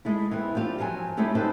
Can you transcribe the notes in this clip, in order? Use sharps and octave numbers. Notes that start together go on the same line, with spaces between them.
G#3 A3 E4
E3 B3 C4
C4 D4 F4 G4
F3 F#3 G#5
G#3 A3 C#4 E4 G4 G#4
D4 D#4 G4 A4 B4 C5